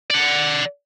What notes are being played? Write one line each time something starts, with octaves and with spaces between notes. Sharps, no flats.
D5 F#5